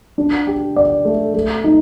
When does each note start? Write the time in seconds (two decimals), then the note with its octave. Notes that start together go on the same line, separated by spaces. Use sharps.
0.18 D4
0.47 G4
0.76 D5
1.05 A3
1.34 A3
1.64 D#4